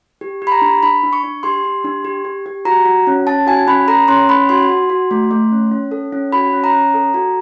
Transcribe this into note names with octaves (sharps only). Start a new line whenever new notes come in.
G4
G4
B5
A#5
D4
D4 B5
D4
C#6
D4
G4 C6
G4
D4
G4
G4
G4
F#4 A#5
F#4
C#4
C#4 A5
F#4 G#5
C#4 B5
A4 A#5
C#4 C6
C#4 B5
F#4 C6
F#4
F#4
A3
A3
C#4
C#4
A4
C#4
F#4 B5
C#4
A#5
C#4
A4
F#4